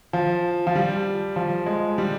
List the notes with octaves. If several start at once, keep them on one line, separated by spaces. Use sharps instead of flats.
F3
F3
G3
F3
G#3
G3